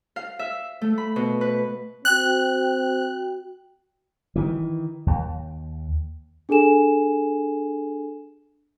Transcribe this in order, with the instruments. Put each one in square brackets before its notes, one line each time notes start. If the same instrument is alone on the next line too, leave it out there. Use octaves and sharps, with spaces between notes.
[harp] F5
E5
A3
B5
B2
B4
[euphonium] C4 [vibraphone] F#4 G5 [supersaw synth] F#6
[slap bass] D#3 E3
D#2
[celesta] D4 G#4 A4 G#5 E7